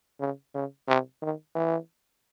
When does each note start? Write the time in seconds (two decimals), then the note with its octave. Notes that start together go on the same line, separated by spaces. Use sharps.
0.20 C#3
0.54 C#3
0.88 C3
1.22 D#3
1.55 E3